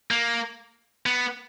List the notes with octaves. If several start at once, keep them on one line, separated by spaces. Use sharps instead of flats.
A#3
B3